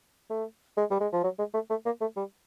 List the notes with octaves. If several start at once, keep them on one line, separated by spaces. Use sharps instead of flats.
A3
G#3
G3
G#3
F3
F#3
G#3
A3
A3
A#3
A3
G3